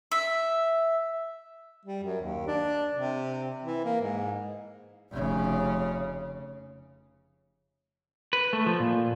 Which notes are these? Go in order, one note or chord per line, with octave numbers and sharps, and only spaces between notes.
E5
G3
F#2
D#2
D4
C3
E3
A#3
G#2
F1 C#3
B4
A3
F3
A#2